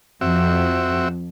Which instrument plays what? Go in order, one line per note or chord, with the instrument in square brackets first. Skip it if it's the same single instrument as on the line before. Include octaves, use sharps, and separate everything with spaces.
[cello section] F2 [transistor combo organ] C4 F#4 E5